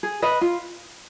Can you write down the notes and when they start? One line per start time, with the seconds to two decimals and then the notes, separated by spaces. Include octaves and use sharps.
0.03 G#4
0.22 B4 D#5
0.41 F4